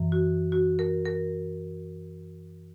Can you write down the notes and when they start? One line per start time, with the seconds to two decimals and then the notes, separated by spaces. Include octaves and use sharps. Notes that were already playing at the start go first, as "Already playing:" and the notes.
Already playing: F#2 E3
0.12 F#4
0.52 F#4
0.79 A#4
1.05 A#4